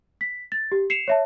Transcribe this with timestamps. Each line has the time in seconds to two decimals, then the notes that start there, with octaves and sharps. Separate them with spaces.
0.21 B6
0.52 A6
0.72 G4
0.90 C7 C#7 E7 F7
1.08 C#5 E5 A5